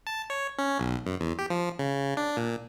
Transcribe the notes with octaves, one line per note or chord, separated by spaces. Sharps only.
A5
C#5
C#4
B1
F#2
E2
G4
F3
C#3
D4
A#2